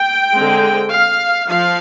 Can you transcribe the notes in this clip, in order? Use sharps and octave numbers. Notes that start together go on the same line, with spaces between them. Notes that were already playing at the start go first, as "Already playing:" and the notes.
Already playing: G5
D3 G#3 C4
F5
F3 F5